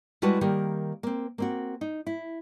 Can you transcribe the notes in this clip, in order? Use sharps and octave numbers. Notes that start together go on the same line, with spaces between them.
G3 G#3 E4 F#4 B4 A5
D#3 G3 A#3
A#3 C4
A#3 C4 F#4
D#4
E4